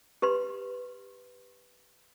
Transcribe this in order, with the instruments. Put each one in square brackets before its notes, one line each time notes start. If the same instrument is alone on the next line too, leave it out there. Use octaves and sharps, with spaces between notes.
[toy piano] G4 B4 C6